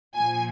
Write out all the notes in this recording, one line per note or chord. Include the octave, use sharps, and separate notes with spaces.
A#2 F3 G#5